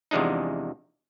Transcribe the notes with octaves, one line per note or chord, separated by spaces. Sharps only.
E2 C3 F3 G#3 D4 D#4